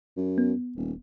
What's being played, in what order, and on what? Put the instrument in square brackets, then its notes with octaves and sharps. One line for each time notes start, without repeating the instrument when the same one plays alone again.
[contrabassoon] F#2
[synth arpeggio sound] B3
[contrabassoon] D#1